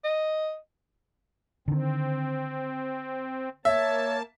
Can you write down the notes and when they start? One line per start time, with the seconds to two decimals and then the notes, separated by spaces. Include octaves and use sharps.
0.04 D#5
1.68 D3 D#3 C4
3.65 A#3 C#5 E5 A5